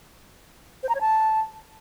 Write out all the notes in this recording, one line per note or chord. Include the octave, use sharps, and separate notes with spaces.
C5
A#5
C#5
A5